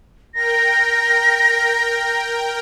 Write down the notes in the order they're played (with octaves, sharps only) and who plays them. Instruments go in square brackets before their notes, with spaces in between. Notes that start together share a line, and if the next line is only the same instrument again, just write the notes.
[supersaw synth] A#4 G5 [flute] A#6